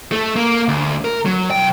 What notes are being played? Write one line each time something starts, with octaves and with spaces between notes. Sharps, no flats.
A3
A#3
D2
A#4
F#3
B1 G5